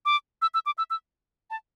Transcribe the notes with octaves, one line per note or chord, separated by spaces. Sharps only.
D6
E6
E6
D6
E6
E6
A5